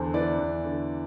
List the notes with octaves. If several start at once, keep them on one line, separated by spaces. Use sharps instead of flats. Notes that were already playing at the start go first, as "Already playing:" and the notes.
Already playing: E2 D3 A4 C5
E3 B4 D5
E2
D3